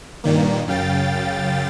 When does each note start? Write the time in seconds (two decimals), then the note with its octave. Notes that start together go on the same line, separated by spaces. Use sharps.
0.24 G2 A#2 D#3 A#3
0.67 F#2 C#3 F5 G5 A6